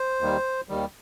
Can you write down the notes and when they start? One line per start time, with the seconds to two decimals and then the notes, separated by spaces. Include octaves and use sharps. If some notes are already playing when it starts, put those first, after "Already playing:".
Already playing: C5
0.21 D#2 D#3 G3
0.69 D#2 D#3 G3